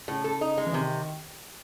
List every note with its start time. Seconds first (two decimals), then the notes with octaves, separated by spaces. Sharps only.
0.08 A2 C#3
0.24 A4
0.41 D#4
0.58 G#3
0.67 E3
0.73 C3 D#3